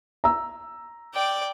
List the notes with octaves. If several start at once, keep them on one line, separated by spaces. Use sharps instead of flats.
A#5 E6
D5 G5